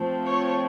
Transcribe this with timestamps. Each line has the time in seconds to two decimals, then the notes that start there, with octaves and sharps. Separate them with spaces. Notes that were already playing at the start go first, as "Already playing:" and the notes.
Already playing: F3 A3 C4
0.25 C#5